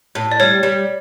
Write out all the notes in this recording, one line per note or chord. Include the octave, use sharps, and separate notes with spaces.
A2
D5
G3 C#5
G3